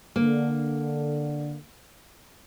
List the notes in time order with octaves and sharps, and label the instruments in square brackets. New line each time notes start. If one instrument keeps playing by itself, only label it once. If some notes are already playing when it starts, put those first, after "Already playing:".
[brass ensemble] D3 [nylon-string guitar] A#3